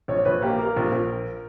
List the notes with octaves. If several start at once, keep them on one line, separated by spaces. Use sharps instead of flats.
A#1 C#5
A#1 B4
A#3 G4
A#3 A#4
A#1
A#1